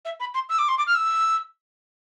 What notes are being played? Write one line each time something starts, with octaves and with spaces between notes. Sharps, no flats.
E5
B5
C6
E6
D6
C6
D6
F6
E6